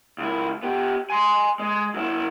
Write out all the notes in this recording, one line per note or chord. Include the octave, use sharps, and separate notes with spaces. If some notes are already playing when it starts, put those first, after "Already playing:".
C#2 E4
B3 G4
G#5 C6
G#3
F#2 E4